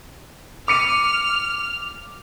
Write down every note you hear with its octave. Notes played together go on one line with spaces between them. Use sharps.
D6 F6 C#7 D#7